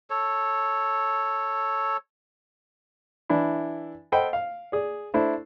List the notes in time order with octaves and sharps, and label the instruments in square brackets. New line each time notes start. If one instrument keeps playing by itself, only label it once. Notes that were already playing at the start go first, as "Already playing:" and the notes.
[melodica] A4 C#5
[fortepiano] E3 D4 E4
A4 C5 D#5 F#5 G5 B5
F5
G#4 D5
A3 D4 E4 C5